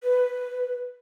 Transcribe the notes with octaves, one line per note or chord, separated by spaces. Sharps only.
B4